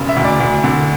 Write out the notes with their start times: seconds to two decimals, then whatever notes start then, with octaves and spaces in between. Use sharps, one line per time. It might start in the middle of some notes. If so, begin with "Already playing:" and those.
Already playing: E1 C#3
0.09 E5
0.17 D2
0.24 D5
0.40 D2
0.64 D3